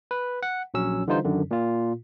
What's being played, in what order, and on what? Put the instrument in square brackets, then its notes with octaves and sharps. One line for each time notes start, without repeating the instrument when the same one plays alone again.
[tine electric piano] B4
F#5
A#1 F#3 C#4 E6
D3 E3 G3 D#4 F4 C5
F#2 D3 D#3
A#2 F4